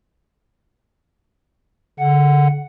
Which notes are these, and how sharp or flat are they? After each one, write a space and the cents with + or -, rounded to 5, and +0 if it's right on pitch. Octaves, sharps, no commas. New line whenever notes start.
D3 -40 F#5 +0